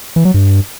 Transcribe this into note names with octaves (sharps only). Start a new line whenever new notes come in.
E3
F#3
G2